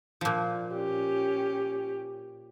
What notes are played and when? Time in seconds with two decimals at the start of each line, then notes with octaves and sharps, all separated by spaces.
0.21 A#2 F3
0.74 C#4 G4